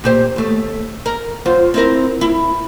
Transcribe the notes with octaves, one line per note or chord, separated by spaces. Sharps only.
A#2 G4 C5
D#2 A3
A#4
F#2 F4 C5
C4 E4 A#4
E4